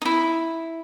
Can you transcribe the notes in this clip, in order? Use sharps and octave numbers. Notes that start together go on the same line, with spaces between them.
D#4 E4